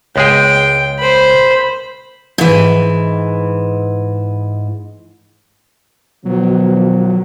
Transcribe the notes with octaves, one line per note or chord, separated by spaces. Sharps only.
C#2 G#3 G#4 G5
C5 B5
G#2 E3
B2 D#3 F3 F#3